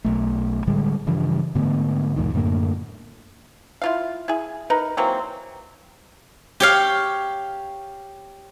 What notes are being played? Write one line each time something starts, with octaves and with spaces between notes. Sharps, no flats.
B1 A3
A2 D3 G3 G#3
G2 C#3 E3 F3
G#2 D3 A3 B3
C2 F2 A2 D#3
F#2 A2 D3 A#3
E4 F4 F5
E4 G#4
D#4 A#4 B4
E3 F#3 A#3 C4
G4 C#5 F5